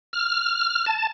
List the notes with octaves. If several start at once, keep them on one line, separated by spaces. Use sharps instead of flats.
F6
A5